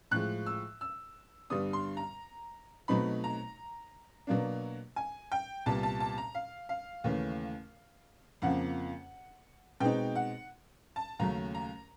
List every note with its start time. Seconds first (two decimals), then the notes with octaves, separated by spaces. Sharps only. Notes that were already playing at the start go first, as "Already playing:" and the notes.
0.11 A2 F3 G#3 F#6
0.46 E6
0.81 E6
1.50 G2 D3 G3 B3 D4 D#6
1.73 C6
1.97 A#5
2.88 B2 F#3 A3 C4 D#4 B5
3.24 A#5
4.27 B2 F#3 A#3 D4
4.96 G#5
5.32 G5
5.66 C2 A#2 G3 B3 A5
5.83 A5
6.00 A5
6.18 A#5
6.35 F5
6.69 F5
7.04 D#2 C#3 E3 A3 C#4
8.42 F2 C#3 F3 A#3 F#5
9.80 B2 G#3 C4 D#4 G5
10.15 F#5
10.96 A5
11.19 D#2 C#3 F#3 A3 C#4 A#5
11.55 A#5